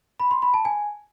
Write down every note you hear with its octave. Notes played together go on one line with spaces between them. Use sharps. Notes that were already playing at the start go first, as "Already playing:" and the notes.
B5
C6
B5
A5
G#5